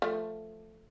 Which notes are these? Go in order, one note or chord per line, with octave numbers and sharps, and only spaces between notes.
F3 A3